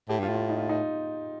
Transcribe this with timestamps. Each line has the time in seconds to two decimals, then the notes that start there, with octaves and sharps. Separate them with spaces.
0.09 A2 G4
0.19 G2 F4
0.29 A2
0.35 F4
0.49 D#4
0.58 F4
0.69 D#4